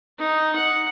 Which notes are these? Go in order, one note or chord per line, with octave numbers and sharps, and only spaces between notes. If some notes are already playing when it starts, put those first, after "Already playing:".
D#4
F#5